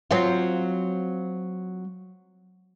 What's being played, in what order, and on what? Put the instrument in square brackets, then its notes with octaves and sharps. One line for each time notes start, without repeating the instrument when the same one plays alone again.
[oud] F#3 C4 F4